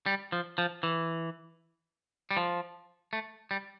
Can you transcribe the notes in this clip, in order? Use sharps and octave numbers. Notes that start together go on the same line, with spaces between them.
G3
F3
F3
E3
G3
F3
A3
G3